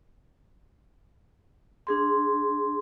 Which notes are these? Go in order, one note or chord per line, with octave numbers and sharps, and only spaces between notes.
D4 G#4 C6